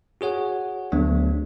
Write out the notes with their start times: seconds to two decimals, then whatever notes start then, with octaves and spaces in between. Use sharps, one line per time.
0.21 F#4 G#4 C#5 F#5
0.92 D2 F#3 B3 D4